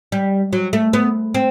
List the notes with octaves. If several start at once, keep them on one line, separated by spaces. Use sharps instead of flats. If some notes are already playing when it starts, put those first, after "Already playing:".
G3
F#3
A3
B3
C4